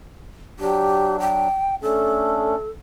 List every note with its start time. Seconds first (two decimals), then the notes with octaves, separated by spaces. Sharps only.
0.59 F#3 D4 G4
1.20 G5
1.82 A3 C#4 D4 A4